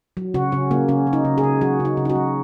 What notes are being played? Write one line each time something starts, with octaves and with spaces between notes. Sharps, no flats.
F#3
C#3 F#4
C#3 C#4
C#3 A#3
C#3 C#4
C#3
D#4
C#3
G#4
C#3
F#3 F#4
C#3
D#4
C#3
D#4
F#4
F#3